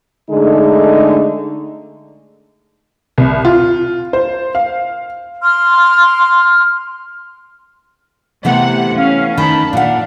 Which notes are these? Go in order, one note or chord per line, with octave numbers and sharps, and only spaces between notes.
D3 G#3 A3 D#4 G#4
C2
F4
C5
F5
C6 F6
C3 E3 A3 B3 F#5
C#4 F5
D#3 A5 B5
A#2 D4 F5 F#5